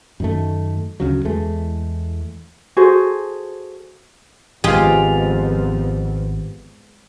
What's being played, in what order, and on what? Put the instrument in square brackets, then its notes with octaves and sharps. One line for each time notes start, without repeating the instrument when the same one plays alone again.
[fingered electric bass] F#2 D#3 A3
D2 C#3 F#3
E2 E3 G#3 A3
[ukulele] F#4 G#4 A4 C5
[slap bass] G#1 C3 [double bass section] F2 F3 B3 [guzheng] G#3 [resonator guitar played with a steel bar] F4 G4